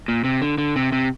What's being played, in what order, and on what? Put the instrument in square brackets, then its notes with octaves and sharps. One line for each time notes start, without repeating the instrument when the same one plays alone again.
[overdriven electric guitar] A#2
C3
D3
D3
C3
C3